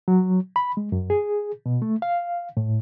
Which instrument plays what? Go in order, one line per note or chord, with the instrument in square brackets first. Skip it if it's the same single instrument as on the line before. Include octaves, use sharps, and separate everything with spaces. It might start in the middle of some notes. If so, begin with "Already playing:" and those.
[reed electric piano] F#3
B5
G#3
F#2
G#4
B2
A3
F5
A2